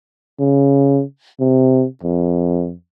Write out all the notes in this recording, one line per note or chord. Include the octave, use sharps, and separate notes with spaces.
C#3
C3
F2